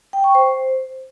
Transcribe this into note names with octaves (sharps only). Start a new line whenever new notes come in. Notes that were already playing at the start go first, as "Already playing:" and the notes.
G5
C#6
C5